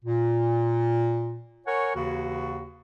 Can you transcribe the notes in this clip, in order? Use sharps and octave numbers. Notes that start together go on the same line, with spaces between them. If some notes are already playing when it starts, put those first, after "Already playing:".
A#2
A#4 C#5 F#5 G#5 C#6
D#2 C#3 E3 F#4